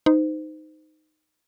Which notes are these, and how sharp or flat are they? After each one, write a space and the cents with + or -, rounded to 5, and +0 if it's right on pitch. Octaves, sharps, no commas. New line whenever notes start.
D#4 +0 C5 -30